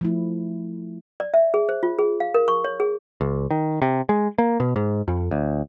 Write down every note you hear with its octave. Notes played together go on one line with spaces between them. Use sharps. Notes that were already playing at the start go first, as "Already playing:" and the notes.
F3 A3 E4
D5
E5
G#4
C5
F4
G#4
F5
A#4
C#6
C#5
G#4
C#2
D#3
C3
G#3
A#3
B2
G#2
F2
D2